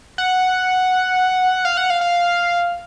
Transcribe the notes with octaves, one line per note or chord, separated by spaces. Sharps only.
F#5
F5
F#5
F5
F5